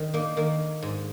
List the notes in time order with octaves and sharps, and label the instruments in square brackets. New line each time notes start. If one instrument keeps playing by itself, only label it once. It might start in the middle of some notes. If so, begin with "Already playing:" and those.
Already playing: [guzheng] D#3
A#3 D#4
D#3 A#3
G#2